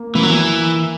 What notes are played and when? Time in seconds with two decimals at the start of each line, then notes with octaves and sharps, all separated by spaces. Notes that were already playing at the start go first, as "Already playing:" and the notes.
Already playing: A#3
0.15 E3 A#3
0.23 F#3
0.30 E3